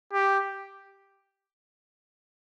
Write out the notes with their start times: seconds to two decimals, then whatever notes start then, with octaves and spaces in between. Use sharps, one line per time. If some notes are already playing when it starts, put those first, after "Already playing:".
0.13 G4